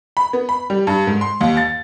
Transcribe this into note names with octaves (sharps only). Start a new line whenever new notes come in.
B5
B3
B5
G3
G2
G#2
C6
D#2
A6